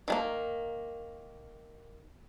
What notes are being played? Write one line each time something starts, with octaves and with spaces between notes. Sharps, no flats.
D#3 G#3 A#3